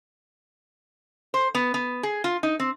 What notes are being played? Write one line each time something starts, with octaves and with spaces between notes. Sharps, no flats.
C5
B3
B3
G#4
F4
D#4
C4